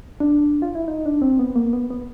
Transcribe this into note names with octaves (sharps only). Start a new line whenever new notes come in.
D4
F4
E4
D#4
D4
C4
B3
A#3
B3
B3